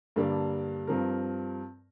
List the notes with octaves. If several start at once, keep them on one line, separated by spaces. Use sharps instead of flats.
G2 D3 G3 A#3 D4
G2 F3 C4 A#4